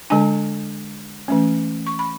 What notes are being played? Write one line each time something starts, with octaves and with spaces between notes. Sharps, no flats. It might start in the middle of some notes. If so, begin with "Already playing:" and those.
D3 G#3 D4 G#5
E3 A3 C#4
C#6
B5